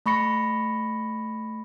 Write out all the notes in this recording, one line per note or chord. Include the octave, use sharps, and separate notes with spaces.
A3 B5 C#6 A#6 C#7